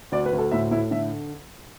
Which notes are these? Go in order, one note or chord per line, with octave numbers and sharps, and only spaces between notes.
D2 D5
B4
D2
A4
A2 E5
A2 E4
D3 E5